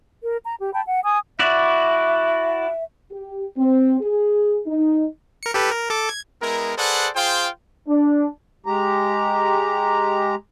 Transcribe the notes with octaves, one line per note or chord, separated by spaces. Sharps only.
A#4
A#5
G4
G5 A5 B5
F#5
G#5 D#6
E4 F#4 D5 E5
G4
C4
G#4
D#4
A#4 C#7
G4 A4 B4
A#4
A4 D6
G#6
G#3 B3 E4 A#4
G#4 A4 B4 C5 D5 F#5
F4 G#4 C5 F5 G5
D4
G#3 G4 A#5